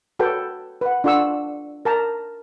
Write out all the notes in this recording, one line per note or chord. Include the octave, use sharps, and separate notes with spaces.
F#4 A4 B4 C#5 G5
B4 F#5
D4 F4 A4 F#5 C#6 E6
A#4 A5 A#5